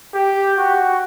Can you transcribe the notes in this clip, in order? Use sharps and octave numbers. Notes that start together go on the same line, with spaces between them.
G4
F#4